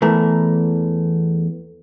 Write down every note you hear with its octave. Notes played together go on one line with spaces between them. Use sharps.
E2 E3 A3 A#4